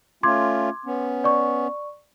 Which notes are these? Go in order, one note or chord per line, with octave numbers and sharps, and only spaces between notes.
A3 C#4 F4 C6 D6 G#6
B3 C#4
D5 C#6